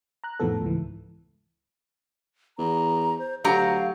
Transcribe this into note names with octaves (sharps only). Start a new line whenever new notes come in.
A#5 F#6
F2 A2 D#3 F3 B3 A4
C#2 G#2 E3
E2 A#5
C5
D2 F#3 G4 F5 A#5